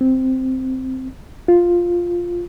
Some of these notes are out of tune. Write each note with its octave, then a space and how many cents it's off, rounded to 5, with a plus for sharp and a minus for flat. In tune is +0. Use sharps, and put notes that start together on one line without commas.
C4 -5
F4 +0